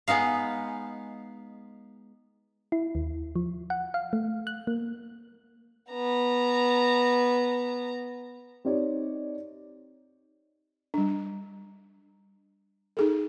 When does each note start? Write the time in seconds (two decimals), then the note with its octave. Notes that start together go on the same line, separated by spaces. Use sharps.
0.08 G#3 B3 D#4 F5
2.72 E4
2.95 D#2
3.36 F3
3.70 F#5
3.94 F5
4.13 A3
4.47 F#6
4.67 A#3
5.90 B3 A#5
8.65 C4 D#4 G4 C#5 D5
10.94 G3 D4
12.97 D#4 G#4 A4